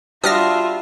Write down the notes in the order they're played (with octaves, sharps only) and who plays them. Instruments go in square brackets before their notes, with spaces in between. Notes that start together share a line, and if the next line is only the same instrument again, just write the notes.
[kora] G3 F#4 [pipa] D4 [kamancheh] F4 E5 [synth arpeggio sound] D#6 F6 A#6